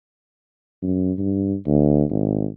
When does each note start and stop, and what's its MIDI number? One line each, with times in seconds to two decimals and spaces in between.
0.82 1.12 42
1.18 1.55 43
1.66 2.04 38
2.10 2.48 32